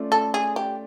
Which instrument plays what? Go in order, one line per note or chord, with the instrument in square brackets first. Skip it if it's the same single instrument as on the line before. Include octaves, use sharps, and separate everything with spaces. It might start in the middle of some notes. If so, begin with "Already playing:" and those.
Already playing: [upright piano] A3 C#4 F4 D5
[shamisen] A4
G#4
G4